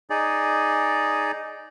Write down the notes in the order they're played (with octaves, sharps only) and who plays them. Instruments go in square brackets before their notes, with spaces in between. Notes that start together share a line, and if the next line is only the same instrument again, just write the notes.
[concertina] D#4 G#4 D5